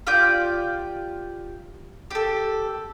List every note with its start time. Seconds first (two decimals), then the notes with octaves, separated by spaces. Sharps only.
0.07 F4 G4 D5 G6
2.11 G4 A4